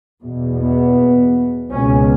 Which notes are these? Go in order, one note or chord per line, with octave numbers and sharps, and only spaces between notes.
E2 B2
B3
C#2 B2 C#4